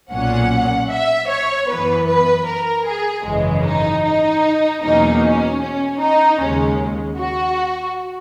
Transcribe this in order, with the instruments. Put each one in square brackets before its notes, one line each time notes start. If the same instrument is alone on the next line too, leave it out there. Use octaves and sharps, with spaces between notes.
[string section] B1 A#2 F#3 C#4 F#5
E5
C#5
F#2 E3 B3 B4
B4
A#4
G#4
G#1 F#2 C#3 E3 G#3
D#4
D#4
E2 B2 F#3 A#3 C#4 D#4
C#4
C#4
D#4
D#2 C#3 G#3 C#4
F#4